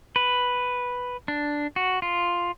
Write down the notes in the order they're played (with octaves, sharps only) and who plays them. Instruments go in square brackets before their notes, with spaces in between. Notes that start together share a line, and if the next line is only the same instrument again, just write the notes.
[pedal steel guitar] B4
D4
F#4
F4